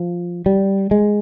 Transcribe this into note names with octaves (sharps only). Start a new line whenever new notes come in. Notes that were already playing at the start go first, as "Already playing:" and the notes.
Already playing: F3
G3
G#3